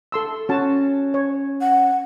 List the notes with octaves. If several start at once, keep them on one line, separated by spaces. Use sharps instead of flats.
A4 C6 E6
C#4 F#4 A5
C#5
F#5